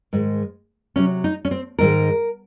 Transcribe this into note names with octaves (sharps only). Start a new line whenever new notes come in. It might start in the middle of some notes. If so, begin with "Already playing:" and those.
G#2 D#3 G#3
C3 F#3 C#4
D#4
C#4
C4
G#2 D#3 G#3 A#4